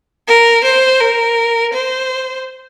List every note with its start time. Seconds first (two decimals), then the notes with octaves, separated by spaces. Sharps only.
0.28 A#4
0.64 C5
1.00 A#4
1.73 C5